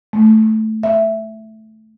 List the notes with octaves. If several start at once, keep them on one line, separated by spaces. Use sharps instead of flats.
A3
E5